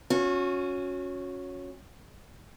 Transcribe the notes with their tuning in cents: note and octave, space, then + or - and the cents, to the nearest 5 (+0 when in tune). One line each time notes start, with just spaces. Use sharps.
C#4 +0 F#4 -30